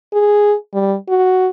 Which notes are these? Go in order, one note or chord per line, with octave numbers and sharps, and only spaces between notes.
G#4
G3
F#4